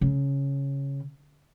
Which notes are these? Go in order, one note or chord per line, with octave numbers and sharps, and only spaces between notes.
C#3